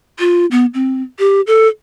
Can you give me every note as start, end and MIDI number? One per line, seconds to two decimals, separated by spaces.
0.19 0.46 65
0.51 0.66 59
0.74 1.02 60
1.19 1.41 67
1.47 1.68 69